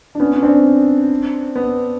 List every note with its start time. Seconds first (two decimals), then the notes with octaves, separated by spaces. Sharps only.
0.15 D4
0.20 B3 C#4
0.36 C#4
0.42 C4 D4
1.56 B3